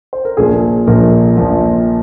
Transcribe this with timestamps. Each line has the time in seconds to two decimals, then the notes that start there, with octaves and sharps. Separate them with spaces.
0.13 C5
0.25 A#4
0.37 A#1 A#2 F3 G#4
0.87 A#1 A#2 F3 A#4
1.37 A#1 A#2 F3